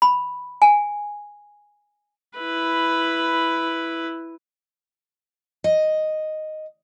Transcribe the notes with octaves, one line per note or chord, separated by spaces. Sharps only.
B5
G#5
E4 B4
D#5